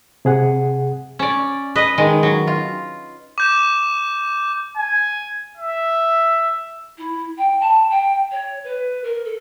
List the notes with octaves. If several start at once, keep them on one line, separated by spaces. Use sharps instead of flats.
C3 G#4 F#5
C#4 D5
B4 D#5
D#3 G#3
F#3
F4
D6 G6 E7
G#5
E5
E4
G5
A5
G5
C#5
B4
A#4
A4